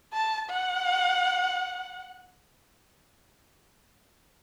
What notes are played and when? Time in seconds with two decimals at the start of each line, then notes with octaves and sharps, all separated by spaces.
0.13 A5
0.50 F#5